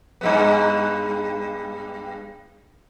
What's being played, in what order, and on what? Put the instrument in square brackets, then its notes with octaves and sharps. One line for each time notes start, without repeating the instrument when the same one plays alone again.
[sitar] G2 G#3 B3